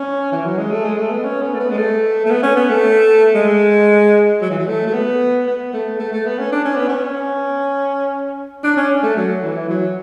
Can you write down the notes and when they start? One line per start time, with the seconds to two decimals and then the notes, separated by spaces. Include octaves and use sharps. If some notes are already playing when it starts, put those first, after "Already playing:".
Already playing: C#4
0.32 E3
0.45 F#3
0.58 G#3
0.72 A3
0.84 G#3
0.98 A3
1.11 B3
1.24 C#4
1.42 B3
1.54 A3
1.60 B3
1.71 G#3
1.77 A3
2.26 A3
2.30 B3
2.43 C#4
2.56 B3
2.70 A3
3.35 G#3
4.41 F#3
4.50 E3
4.59 F#3
4.68 A3
4.87 A3
4.93 B3
5.47 B3
5.73 A3
6.00 A3
6.13 A3
6.26 B3
6.39 C#4
6.52 D4
6.65 C#4
6.76 B3
6.89 C#4
8.64 D4
8.77 C#4
9.03 A3
9.16 F#3
9.43 E3
9.69 F#3